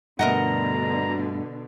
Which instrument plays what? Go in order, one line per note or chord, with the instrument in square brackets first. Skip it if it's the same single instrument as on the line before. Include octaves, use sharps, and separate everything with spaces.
[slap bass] G2 A3 [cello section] B2 D3 [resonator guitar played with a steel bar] A#4 D#5 F#5 [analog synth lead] A#5